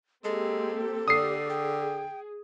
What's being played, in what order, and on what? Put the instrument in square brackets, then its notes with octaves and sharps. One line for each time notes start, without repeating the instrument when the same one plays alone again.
[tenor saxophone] G#3 [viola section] A#3 C4 G4 [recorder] A4
[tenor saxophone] D3 [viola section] G4 D5 [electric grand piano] D#6 C7
[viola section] G#4 [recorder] G5